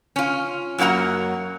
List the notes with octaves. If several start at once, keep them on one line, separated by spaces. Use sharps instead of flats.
C#4 F4
F#2 F#3 A#3 F#5 A#5